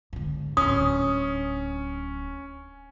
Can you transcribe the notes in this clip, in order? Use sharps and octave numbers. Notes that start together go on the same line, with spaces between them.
G#2 D3
D1 C#4 D4 D#6